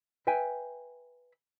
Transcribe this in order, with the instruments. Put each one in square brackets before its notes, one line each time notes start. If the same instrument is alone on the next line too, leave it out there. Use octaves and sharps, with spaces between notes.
[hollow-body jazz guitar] B4 E5 G5 G#5